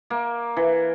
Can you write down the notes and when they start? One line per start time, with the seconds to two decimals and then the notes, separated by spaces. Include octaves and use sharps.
0.10 A#3
0.56 E3